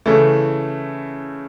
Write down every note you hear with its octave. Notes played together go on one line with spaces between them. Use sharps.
C#3 E3 A3 E4